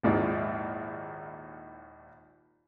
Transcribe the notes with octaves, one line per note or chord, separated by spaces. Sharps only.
A#1 D#2 G#2 E4 D5